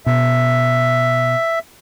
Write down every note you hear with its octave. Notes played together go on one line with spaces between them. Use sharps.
B2 E5